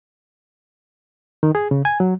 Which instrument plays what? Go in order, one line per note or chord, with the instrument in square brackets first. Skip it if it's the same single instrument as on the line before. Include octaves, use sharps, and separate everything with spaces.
[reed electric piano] D#3
G#4
C#3
G#5
F#3